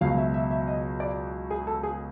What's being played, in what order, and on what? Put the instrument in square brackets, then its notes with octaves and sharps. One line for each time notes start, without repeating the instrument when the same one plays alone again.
[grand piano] C#2 B2 F#3 F5
E5
E5
E5
D#5
D5
G#4
A4
G#4